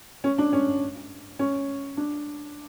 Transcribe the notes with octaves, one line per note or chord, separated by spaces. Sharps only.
C#4
D4
C#4
C#4
D4